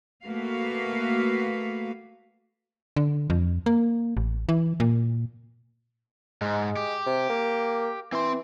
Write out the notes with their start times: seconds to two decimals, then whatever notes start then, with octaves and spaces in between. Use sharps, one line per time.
0.25 A3 A#3 F#4 B4 F5
2.96 D3
3.30 F2
3.66 A#3
4.17 A1
4.49 E3
4.80 A#2
6.42 G#2 G#3
6.76 G4
7.07 C3
7.30 A#3
8.12 E3 C4 C6